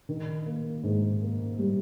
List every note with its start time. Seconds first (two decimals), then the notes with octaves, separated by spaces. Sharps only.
0.09 D#3
0.46 A#3
0.83 G#2
1.22 A#3
1.59 G3